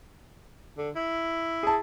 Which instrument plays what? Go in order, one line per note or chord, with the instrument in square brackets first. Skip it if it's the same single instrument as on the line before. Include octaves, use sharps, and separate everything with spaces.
[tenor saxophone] D3
E4
[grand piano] G#4 A5